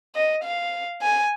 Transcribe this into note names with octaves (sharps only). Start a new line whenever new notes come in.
D#5
F5
G#5